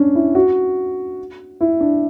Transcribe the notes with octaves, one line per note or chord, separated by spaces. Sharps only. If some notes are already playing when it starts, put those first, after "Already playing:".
Already playing: C#4 D4
E4
F#4
E4
D4